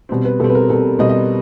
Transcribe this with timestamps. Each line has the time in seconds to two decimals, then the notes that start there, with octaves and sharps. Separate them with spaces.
0.09 B2 G3 C4
0.25 B4
0.40 B2 G3 C4 A4
0.50 B4
0.55 A#4
0.69 B2 G3 C4 A4
0.99 B2 G3 C4 D#5
1.10 D#5